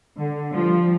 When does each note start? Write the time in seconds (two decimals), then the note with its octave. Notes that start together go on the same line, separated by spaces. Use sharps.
0.17 D3
0.53 F3 G3